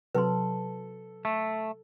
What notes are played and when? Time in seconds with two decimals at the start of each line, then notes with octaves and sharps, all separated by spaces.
0.15 C3 F#3 A4 B4 C6
1.25 A3